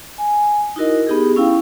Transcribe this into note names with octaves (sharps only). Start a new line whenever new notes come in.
G#5
D#4 E4 F#4 A#4 D#5
B3 D#4 G4 G#4
C#4 E4 F5 G5